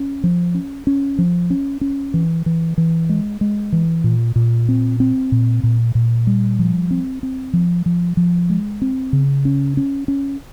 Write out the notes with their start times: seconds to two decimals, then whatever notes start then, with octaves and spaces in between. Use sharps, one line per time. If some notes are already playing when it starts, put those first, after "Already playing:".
Already playing: C#4
0.24 F3
0.55 C#4
0.87 C#4
1.18 F3
1.50 C#4
1.81 C#4
2.14 E3
2.46 E3
2.78 E3
3.09 G#3
3.41 G#3
3.72 E3
4.04 A#2
4.36 A#2
4.69 C4
5.00 C4
5.32 A#2
5.63 A#2
5.95 A#2
6.27 G3
6.59 F3
6.91 C4
7.23 C4
7.53 F3
7.86 F3
8.17 F3
8.50 G#3
8.82 C4
9.13 C#3
9.45 C#4
9.77 C#4
10.08 C#4